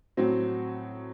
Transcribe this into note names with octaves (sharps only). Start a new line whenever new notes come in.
A2 F#3 C4